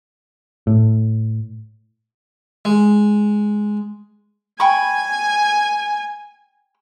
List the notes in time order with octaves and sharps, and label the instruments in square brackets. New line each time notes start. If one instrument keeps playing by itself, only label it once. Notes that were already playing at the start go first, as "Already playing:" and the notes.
[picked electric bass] A2
[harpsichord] G#3
[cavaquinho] G5 B5 C#6 [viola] G#5